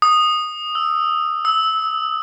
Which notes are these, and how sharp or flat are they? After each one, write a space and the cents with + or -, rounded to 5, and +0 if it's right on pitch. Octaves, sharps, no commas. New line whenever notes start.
D#6 -10
E6 -5
E6 -20